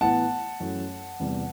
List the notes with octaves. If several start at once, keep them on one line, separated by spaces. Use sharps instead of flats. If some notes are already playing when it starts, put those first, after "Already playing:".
A2 E3 B3 F#5 A5
F#2 E3 A3
E2 C3 G3